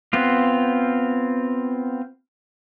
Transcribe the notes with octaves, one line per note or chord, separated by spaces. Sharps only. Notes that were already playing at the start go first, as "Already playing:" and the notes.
B3 C4 F4